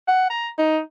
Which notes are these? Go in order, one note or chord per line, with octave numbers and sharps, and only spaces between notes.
F#5
A#5
D#4